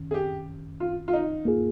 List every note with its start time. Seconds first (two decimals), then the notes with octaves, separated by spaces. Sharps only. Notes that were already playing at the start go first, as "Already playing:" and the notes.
Already playing: D#3 C#4
0.11 G#4
0.14 G4
0.80 F4
1.08 F4
1.13 D#4
1.45 A#3 F4 G#4